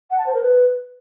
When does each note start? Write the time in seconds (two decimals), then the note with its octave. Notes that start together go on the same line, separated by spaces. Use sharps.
0.10 F#5
0.18 A5
0.26 C5
0.34 A#4
0.42 B4